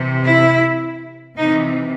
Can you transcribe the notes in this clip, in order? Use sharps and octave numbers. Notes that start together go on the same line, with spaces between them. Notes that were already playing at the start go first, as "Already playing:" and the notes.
Already playing: C3 E3
E4
C3 E3 D#4